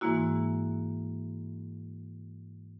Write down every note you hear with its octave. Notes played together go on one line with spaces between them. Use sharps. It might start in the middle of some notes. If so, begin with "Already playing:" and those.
G#2 E3 G#3 A#3 E4 F#4